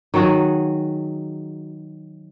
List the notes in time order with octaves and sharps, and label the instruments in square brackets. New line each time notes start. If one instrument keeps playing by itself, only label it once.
[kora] D#3 F#3 F#4 G#4